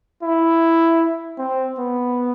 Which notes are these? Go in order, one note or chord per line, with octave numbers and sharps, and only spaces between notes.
E4
C4
B3